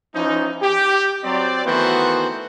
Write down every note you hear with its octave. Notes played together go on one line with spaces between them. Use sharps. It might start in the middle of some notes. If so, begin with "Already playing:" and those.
E3 F3 C#4 D#4
G4
F#3 C4 D5
D#3 E3 A3 B3 F#4 C5